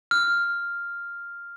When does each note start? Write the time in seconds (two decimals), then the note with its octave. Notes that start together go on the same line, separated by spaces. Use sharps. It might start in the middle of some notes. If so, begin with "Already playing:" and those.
0.11 F6